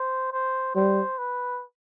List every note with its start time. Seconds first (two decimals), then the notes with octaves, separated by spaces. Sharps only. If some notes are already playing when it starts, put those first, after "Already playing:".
Already playing: C5
0.33 C5
0.75 G3 C5
1.18 B4